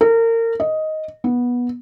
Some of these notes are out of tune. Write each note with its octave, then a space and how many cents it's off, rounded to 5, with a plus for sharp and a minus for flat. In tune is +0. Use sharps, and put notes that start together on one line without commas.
A#4 -30
D#5 +5
B3 -15